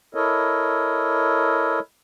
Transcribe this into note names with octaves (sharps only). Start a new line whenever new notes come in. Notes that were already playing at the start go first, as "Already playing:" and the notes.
E4 A4 A#4 C#5 D#5